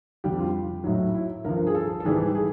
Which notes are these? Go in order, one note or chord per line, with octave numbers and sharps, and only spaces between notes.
F2 D3 G3 G4
F4
A2 F#3 D#4
E4
G2 D3 F3 A#4
G#4
A4
A4
G#2 E3 G3 G#4
G#4